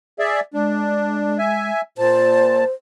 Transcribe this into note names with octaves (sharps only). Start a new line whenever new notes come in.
G#4 D5 E5
G#3 D4
E5 G#5
A#2 C5 A5